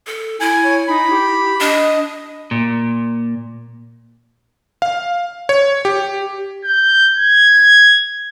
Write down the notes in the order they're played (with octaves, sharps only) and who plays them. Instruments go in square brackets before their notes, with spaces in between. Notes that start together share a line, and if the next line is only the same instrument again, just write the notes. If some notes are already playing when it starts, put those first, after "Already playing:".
[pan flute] A4
[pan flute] E4 [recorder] G#5
[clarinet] C#5
[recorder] D#4 [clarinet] B5
[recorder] G4
[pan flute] D4 [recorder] D#5
[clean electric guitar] A#2
[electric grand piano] F5
C#5
G4
[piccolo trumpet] G6
G#6